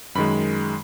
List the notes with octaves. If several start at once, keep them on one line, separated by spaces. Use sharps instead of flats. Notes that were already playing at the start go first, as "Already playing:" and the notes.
F#2 D#3 G#3 B5